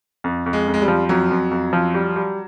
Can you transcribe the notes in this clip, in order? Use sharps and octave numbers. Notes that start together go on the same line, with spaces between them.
F2
F2
G#3
F2
G#3
G3
F3
F2 F#3
F2
F2
F3
G3
G3